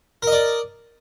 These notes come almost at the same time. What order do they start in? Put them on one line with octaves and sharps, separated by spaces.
A#4 D#5 D5